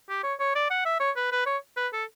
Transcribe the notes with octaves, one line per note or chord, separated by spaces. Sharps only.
G4
C#5
C#5
D5
F#5
E5
C#5
B4
B4
C#5
B4
A4